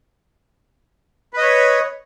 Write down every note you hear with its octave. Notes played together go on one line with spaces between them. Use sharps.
B4 C#5 D#5